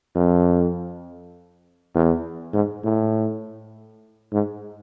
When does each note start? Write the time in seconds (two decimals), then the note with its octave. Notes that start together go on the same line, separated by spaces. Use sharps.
0.15 F2
1.94 E2
2.54 G#2
2.84 A2
4.32 G#2